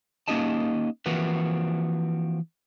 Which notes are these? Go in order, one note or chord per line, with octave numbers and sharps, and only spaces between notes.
A#3 C#4 D#4 G4 D#5 A5
E3 F3 A#3 C4 F#4 B4